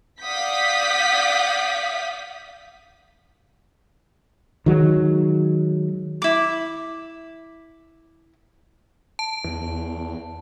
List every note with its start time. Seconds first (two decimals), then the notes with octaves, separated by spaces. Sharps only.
0.22 D5 F5 F#5 D#6 G6 B6
4.66 D#3 F#3 G#3
6.22 E4 D6
9.19 A5
9.44 E2